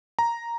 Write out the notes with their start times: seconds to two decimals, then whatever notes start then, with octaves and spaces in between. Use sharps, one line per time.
0.19 A#5